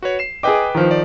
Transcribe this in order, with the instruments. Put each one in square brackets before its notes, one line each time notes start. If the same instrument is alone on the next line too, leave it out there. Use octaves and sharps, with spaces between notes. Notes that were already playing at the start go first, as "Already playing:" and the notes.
[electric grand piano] F#4 B4 C#5
C7 E7
[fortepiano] G#4 D#5 [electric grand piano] B4 G5 D6
[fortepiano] D#3 F3
[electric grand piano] D5